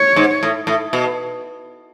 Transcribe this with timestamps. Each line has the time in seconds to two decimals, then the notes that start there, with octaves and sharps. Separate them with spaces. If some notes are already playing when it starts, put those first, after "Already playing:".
Already playing: C#5
0.16 G#2
0.43 A2
0.67 A2
0.93 B2